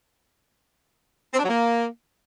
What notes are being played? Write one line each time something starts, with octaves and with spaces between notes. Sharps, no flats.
C4
D4
F#3
A#3